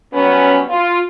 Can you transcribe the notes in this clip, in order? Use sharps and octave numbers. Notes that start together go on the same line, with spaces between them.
F#3 G3 B3 C#4
F4